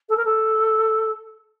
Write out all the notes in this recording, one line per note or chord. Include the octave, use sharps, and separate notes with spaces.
A4
A#4
A4